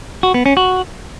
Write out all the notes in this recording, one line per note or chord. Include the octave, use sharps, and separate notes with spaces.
F#4
B3
C#4
F#4